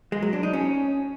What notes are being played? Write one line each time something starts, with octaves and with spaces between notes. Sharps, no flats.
G#3
F#3
D4
D#4
C#4